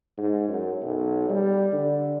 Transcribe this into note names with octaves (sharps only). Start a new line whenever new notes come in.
G#2
F#2
B1
G3
D3